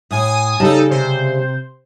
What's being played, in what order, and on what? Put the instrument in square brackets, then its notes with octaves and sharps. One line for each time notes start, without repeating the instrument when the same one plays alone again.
[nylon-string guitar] A2 [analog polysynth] G#5 D#6
[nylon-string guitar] C#3 G3 A5 [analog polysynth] D#4 A4
[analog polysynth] C3 C5